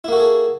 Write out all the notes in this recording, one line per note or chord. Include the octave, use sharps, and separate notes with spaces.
A#3 E4 F#4 G#4 A4